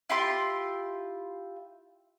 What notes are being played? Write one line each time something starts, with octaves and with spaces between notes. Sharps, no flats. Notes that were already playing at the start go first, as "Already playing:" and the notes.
E4 F4 G4 C6